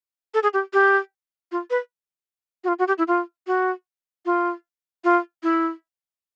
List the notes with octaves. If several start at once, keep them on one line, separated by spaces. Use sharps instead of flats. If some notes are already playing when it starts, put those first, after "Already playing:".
A4
G#4
G4
G4
F4
B4
F#4
F4
F#4
G4
E4
F4
F#4
F4
F4
E4